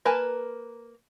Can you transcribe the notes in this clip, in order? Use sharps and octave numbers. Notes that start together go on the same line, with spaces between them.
A#3 A#4 B4 G#5 A5